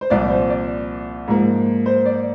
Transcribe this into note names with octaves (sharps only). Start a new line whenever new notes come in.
C5
C2 A#2 F3 D5
C5
D5
G#2 F3 A#3
C5
D5